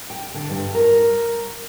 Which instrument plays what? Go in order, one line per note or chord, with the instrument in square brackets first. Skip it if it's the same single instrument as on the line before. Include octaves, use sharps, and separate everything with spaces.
[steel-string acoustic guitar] G5
D3
G2
A#4